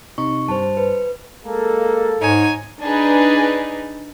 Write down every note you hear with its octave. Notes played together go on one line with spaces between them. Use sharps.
C3 D#4 C#6
G2 G3 C5 A5
B4
G#3 A#3 A4
G#2 D#4 C#5 G#5
D4 D#4 G#4 B4